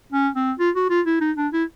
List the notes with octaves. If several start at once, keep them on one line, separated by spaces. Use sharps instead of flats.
C#4
C4
F4
F#4
F4
E4
D#4
D4
E4